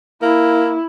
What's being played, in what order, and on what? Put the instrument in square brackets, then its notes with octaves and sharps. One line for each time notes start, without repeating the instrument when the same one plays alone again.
[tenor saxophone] A#3 [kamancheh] E4